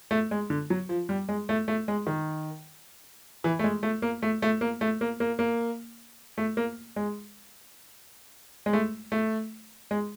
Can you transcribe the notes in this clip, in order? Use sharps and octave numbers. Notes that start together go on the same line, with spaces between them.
A3
G#3
D3
F#3
F3
G3
G#3
A3
A3
G#3
D#3
E3
A3
G#3
A3
A#3
A3
A3
A#3
A3
A#3
A#3
A#3
A3
A#3
G#3
G#3
A3
A3
G#3